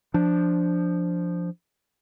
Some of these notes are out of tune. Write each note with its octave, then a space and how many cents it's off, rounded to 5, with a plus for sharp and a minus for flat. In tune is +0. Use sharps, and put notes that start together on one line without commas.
F3 +0 D4 +0